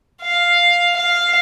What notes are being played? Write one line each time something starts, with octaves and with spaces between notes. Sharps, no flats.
F5
F5